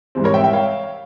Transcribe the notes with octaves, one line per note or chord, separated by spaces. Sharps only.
G#2 E3 G3 C4
A#4 C#5
E5 G5
E5 G5
C#5 F5